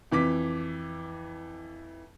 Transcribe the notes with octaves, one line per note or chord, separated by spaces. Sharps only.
F2 E3 D6 B6